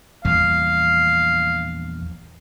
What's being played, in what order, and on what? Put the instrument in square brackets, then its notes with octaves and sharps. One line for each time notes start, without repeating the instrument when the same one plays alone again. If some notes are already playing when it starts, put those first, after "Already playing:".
[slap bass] A#1 E2 G3 [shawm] F5